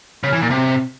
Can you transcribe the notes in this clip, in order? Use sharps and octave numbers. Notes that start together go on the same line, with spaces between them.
C#3
E3
A#2
C3